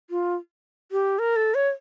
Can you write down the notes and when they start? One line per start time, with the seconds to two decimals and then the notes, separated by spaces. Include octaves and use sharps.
0.10 F4
0.92 G4
1.19 A#4
1.36 A4
1.55 C#5